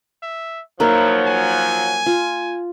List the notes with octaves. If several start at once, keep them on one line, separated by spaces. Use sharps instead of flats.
E5
F3 F#3 A#3 D#4 E4 A#4
G#5
F4